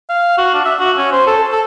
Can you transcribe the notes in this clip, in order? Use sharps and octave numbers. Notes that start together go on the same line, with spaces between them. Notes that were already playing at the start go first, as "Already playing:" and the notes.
F5
F#4
D4
E5
F#4
C#4
C5
A4
A4